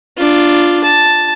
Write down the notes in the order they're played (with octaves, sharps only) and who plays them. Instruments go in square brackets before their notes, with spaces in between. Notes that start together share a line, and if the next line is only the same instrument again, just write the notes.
[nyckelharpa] D4 F4
A5